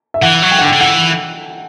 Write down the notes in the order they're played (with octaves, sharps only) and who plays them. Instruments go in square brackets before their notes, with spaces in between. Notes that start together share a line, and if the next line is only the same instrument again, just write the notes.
[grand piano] E5
[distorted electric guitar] E3 [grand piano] F#5
[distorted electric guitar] F#3
[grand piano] G5
[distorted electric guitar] D3 [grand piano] F#5
[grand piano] G5
[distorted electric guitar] D3
[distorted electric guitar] E3 [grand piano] F#5